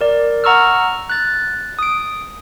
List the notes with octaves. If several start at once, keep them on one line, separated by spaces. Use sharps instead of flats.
A#4 D5
F#5 A#5 C#6 E6 F6
F#6 A6
D#6 D7